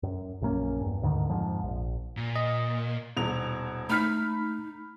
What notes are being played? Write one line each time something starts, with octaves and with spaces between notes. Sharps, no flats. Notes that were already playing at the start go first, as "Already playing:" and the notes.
F#2
A#1 F#2 A#3 C#4
E2 G2
D2 G#2 D3 D#3
F2 G#2 F3
A#1
A#2
D#5
D#1 B2 F7
A3 D#4 B5 F6 B6